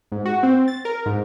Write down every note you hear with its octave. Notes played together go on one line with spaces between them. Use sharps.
G#2
F#4
C4
A6
A#4
G#2